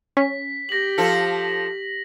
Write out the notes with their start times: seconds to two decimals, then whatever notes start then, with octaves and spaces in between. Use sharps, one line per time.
0.17 C#4 B6
0.69 G4 A#6 F#7
0.98 F3 F4 A4